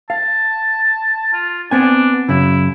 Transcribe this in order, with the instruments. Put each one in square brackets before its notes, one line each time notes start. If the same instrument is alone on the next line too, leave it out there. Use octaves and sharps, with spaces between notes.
[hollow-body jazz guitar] F5 [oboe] A5
[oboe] F4
[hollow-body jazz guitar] B3 C4 G#5 [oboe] D4
[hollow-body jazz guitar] F#2 C#3 [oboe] E4